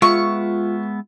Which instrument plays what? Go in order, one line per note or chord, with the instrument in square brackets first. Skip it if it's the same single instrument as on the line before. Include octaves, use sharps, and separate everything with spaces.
[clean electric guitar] G#3 B3 E5 [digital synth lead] F4 [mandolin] C#6